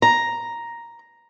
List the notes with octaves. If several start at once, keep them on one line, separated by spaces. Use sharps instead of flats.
A#5